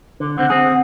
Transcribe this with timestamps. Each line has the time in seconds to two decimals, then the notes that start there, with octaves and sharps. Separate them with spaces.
0.20 D3
0.38 D3 C4 F#5
0.50 C4 G#4